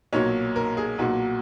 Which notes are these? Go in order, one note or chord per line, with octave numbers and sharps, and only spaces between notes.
B1 A#2 F#3 C#5
A#4
G#4
B1 A#2 F#3 F#4